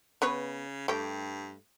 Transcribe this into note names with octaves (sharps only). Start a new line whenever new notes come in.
C#3 B3 B4 C#5
G2 A3 G4